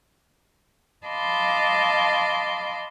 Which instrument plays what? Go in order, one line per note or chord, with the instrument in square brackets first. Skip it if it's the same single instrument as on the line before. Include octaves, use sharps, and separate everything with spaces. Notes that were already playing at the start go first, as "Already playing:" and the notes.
[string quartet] D#5 F5 A5 B5 C6 D6